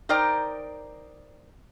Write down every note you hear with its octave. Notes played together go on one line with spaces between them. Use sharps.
D#4 A#4 C5 D5 G5